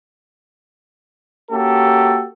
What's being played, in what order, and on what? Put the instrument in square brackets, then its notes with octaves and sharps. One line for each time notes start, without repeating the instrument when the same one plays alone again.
[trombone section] A#3 C#4 F#4 G4 A4